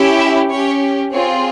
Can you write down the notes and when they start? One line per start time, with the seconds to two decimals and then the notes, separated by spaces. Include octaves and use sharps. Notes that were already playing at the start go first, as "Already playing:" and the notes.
Already playing: C#4 E4 G4
0.18 E5
0.50 C#4 G4 C#5
1.13 C4 F4 G#4 C#5